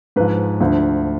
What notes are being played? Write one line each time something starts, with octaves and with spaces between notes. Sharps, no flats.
G#2 F3 B4
D2 D3 F3